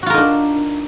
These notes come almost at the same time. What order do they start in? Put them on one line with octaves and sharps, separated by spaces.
F#4 F4 A#4 D#4 D4